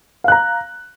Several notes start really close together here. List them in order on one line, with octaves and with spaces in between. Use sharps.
F5 F#6 A#5